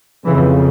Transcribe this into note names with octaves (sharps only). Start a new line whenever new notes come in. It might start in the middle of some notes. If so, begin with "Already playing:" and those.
F2 C#3 E3